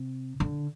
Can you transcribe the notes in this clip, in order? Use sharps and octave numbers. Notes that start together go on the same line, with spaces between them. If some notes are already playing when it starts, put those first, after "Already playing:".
Already playing: C3
D3